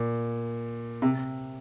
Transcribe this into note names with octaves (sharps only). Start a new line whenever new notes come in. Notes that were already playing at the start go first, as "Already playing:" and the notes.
Already playing: A#2
C3